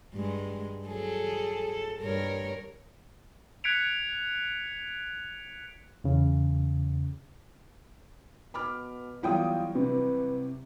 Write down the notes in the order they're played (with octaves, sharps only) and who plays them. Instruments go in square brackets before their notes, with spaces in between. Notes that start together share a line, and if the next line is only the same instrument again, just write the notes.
[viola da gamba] G2 G#3
F#3 G#4 A4
A4
G2 A#4 C#5
[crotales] F#6 G#6 B6 C#7 D7 F7
[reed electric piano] E2 C#3
[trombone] B2 [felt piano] B5 D6 F6
[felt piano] E3 F#3 G3 [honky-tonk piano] B3 G5 D#6 [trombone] F4
[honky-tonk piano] C3 [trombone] B4